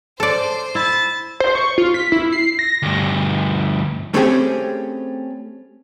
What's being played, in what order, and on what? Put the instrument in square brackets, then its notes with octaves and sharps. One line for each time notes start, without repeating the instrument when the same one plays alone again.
[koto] A4 D5 [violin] C5
[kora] E4 [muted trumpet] A5
[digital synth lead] C5
C#6
F4
B6
E4
C7
A#6
[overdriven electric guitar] D2 G2
[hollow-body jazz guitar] A3 C4 C#4 G4 G#4